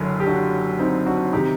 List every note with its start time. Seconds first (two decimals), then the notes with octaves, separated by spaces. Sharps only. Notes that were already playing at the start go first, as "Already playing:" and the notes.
Already playing: F#1 F#2 D3
0.20 G4
0.26 D4 F#4
0.79 C4 D#4
1.06 D4 F#4
1.33 C3 D#3 D#4 G4